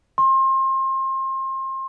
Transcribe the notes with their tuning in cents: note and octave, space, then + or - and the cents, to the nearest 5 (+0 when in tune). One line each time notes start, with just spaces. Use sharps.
C6 +30